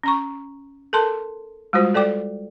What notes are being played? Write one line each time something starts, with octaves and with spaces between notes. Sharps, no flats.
C#4 A#5 C#6
A4 A#4 A5 C6
G3 G#3 F4 F#4 C5
A4 D5 G5 D6